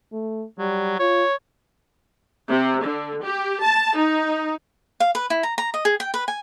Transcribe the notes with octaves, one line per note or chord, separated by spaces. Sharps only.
A3
F#3 G3
F4 C#5
C3
D3
G4
A5
D#4
F5
B4
E4
A#5
A#5
D#5
G#4
G5
B4
G#5